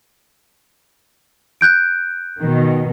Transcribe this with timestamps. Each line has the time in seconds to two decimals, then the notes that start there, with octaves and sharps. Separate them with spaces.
1.61 F#6 G6 D7
2.41 B2 D#3